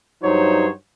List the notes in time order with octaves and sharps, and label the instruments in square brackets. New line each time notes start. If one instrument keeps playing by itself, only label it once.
[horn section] G2 F#3 D#4 C5 C#5